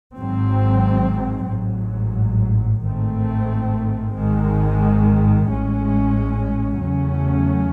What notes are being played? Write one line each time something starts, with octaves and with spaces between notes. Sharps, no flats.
G#1 G#2 F#3 C4
A1 G#2 F#3
A1 G#2 D#3 A3 C4
G#1 G#2 D#3 G#3
A1 A2 G#3 C#4
E2 C#3 F#3 A3 C#4